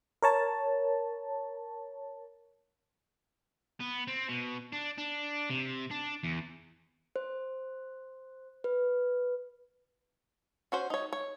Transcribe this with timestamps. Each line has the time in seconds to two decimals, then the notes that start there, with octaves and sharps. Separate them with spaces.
0.22 A#4 C#5 A5
3.80 B3
4.07 C4
4.28 B2
4.73 D4
4.98 D4
5.50 C3
5.91 D4
6.23 E2
7.16 C5
8.64 B4
10.72 C#4 F#4 C5
10.90 D#4 C#5
11.13 C#5